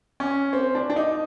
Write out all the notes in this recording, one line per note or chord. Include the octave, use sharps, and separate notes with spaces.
C#4
C4
D4
D4
D#4